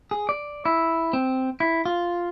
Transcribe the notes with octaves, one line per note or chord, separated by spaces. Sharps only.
G#4
D5
E4
C4
E4
F4